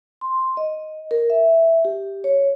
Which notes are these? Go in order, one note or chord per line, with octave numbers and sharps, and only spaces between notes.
C6
D#5
A#4
E5
G4
C#5